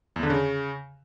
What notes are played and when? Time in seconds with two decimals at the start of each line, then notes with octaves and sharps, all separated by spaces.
0.16 E2
0.23 D3
0.30 C#3